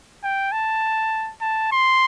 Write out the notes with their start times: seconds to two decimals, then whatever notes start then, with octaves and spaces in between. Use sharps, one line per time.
0.24 G5
0.52 A5
1.42 A5
1.73 C6